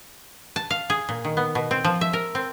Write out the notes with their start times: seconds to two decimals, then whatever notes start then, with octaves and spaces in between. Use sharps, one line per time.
0.56 A5
0.70 F5
0.90 G#4
1.09 A#2
1.25 D#3
1.37 B3
1.55 B2
1.71 C4
1.84 F3
2.01 E5
2.13 A#4
2.35 C4